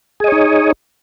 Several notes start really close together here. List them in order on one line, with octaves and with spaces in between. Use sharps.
G#4 D#5 C#5 D#4